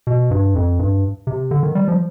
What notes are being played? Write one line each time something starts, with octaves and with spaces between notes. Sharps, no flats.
B2
G2
F2
G2
C3
D3
D#3
G3
F3